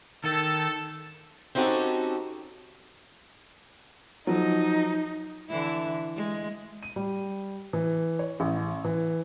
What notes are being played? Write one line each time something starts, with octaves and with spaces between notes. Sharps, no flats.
D#3 A4
C4 C#4 D#4 F#4 G4 A4
F3 F#3 D#4
D3 E3 E4
G#3
D#7
G3
E3
C#5
A1
E3